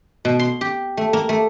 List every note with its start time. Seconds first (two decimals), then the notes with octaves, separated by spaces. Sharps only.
0.25 B2
0.39 C6
0.61 G4
0.97 A3
1.13 A#3
1.29 A3